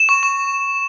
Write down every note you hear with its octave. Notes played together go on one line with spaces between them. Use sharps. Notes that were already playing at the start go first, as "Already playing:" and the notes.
Already playing: E7
C#6
C#6